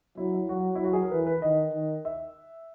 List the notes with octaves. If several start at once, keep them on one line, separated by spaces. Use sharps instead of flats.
F#3 E4
E4
F#3 F#4
E4
F#3 F#4
G#4
A#4
E3 B4
B4
D#3 D#5
D#3
E5